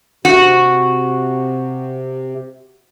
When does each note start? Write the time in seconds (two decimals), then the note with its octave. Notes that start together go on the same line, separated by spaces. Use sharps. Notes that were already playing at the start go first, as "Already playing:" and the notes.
0.25 C3 F#4